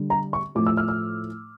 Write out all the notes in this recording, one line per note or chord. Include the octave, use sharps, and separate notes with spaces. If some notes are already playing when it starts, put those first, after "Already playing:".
Already playing: D3 G3
A#5
C#6
A2 F3 A3 D6
E6
F6
E6